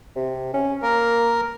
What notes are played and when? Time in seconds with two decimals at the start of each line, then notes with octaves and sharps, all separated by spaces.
0.16 C3
0.54 C#4
0.82 A#3 A#4